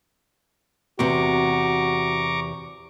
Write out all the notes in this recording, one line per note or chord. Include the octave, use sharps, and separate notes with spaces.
E2 C3 F#4 A#5 C#6 D6